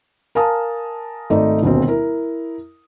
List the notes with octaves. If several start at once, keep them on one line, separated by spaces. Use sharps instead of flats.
A#4 F5 G#5 A5 D#6
G#1 A3 D#4 D5 D#5
D#1 D2 B2 C4
E4 A#4